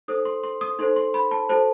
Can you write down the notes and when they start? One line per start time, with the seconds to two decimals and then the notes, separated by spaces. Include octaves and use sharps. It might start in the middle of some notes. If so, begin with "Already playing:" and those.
0.08 D#4 A4 C5 D#6
0.25 C6
0.44 C6
0.61 D#6
0.79 D#4 A4 C5 C6
0.96 C6
1.14 B5
1.31 A5
1.49 F#4 A4 C5 A5